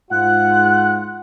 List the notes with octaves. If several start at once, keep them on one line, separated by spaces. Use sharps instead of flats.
G#2 F4 F#5 F#6